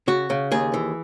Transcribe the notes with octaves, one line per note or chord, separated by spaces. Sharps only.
C#3 F#4
C#3
D#2 G#4
E3